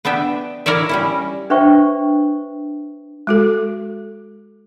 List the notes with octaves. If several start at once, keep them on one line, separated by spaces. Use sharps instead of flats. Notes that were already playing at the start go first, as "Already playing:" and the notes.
B3 D4 E5 G5
E4 A#4 C#5 D5 E5
G3 C#4 E4
D4 B4 C5 E5 G5 C#6
G#3 F#4 A4